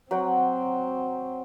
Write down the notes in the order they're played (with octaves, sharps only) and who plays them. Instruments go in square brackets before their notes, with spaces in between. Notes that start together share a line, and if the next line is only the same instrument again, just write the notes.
[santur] F#3 F#5 G5 [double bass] C4